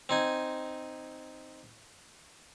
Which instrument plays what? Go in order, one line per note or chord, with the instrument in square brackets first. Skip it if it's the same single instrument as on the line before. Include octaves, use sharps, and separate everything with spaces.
[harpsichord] C4 D#4 G#5